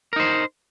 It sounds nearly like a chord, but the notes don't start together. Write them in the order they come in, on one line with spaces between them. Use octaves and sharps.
A#4 D#4 C5